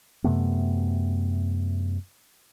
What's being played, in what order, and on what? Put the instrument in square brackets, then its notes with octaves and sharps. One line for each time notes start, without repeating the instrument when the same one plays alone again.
[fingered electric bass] F#2 C3 A3 B3